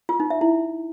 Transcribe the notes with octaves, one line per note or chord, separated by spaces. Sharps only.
F4
D#4
E5
E4